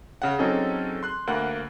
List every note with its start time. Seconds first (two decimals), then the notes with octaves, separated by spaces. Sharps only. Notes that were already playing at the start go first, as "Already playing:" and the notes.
0.22 C#3 F#5
0.39 F#3 C4 C#4 D#4 G#4 A4
1.03 C6 F#6
1.27 D2 A#3 F#5 F#6